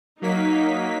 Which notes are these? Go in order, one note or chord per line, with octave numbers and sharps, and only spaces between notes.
F#3 A#3 D#4 B6